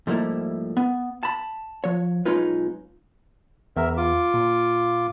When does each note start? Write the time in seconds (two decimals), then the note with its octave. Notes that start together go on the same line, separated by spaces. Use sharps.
0.07 G#2 F3 G3 A3 A#3 E4
0.77 B3
1.23 A5 B5
1.84 F3 C#5
2.25 B1 G#3 C#4 D#4 F4 B4
3.77 E2 A#4 E5
3.97 F4 D6
4.34 A#2